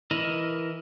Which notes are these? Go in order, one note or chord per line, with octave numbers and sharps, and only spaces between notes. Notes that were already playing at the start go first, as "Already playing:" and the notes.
E3 E4 A#4 D#5